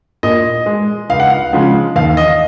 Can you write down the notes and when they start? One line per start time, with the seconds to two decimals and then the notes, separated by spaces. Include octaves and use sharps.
0.23 A#2 D#5
0.66 G#3
1.10 C#2 F5
1.20 F#5
1.30 F5
1.53 C#3 F3 G#3
1.96 D#2 F5
2.17 D#5